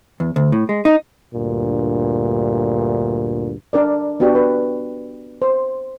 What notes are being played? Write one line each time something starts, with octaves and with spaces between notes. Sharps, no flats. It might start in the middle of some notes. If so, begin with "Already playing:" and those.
E2
D2
A2
G#3
D#4
D2 G2 A#2
D4 A#4 D5
B3 D4 F#4 G4
B4
C5